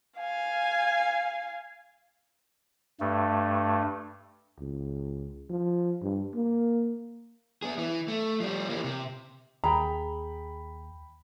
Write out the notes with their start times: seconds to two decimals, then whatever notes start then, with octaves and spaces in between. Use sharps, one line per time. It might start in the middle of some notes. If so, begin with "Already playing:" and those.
0.19 F5 G#5
3.00 G2 A3
4.59 C#2
5.50 F3
6.02 G2
6.34 A#3
7.62 B3 G#4
7.79 E3
8.08 A3
8.40 F3 G3
8.69 E3 A#3
8.84 C3
9.64 D#2 G#4 G5 A#5 B5